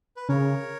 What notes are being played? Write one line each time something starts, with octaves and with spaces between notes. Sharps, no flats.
B4
C#3 A#4 C#5